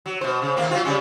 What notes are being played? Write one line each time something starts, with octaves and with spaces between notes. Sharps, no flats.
F#3
B2 C5
C#3
D#2 A#3 C4
F#3 C4 F4
C#3 G3 C#4